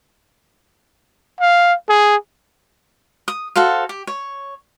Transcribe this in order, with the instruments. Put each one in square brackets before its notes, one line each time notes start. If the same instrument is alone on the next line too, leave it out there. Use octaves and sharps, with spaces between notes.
[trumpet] F5
G#4
[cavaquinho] D#6
F#4 A4 C5 F5
G4
C#5